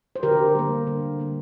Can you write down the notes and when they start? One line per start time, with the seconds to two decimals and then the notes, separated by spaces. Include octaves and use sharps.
0.16 C5
0.23 D3 G4 A#4
0.55 G3 A#3
0.87 D3
1.19 G3 A#3